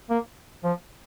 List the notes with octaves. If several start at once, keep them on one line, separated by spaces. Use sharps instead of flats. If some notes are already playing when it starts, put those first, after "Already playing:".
A#3
F3